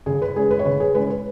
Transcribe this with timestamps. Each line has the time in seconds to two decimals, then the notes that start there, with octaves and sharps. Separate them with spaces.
0.06 C#3 G#4
0.22 B4
0.36 G#3 C#4 G#4
0.51 B4
0.59 C#5
0.65 C#3 B4
0.80 G#4
0.95 G#3 C#4 B4
1.10 B4